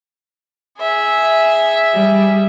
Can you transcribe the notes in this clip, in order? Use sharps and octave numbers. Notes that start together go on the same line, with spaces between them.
G#4 E5
G3